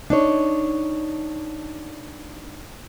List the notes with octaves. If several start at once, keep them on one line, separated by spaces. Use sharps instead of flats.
D4 D#4 C#5